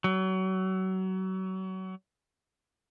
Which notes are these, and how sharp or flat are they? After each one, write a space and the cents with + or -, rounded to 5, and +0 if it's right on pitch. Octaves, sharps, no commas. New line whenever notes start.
F#3 +30